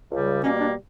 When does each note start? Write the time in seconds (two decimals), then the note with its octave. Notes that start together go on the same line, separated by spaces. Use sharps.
0.12 C#2 C#3 G3
0.44 B2 G3 A#3 C#4
0.59 D4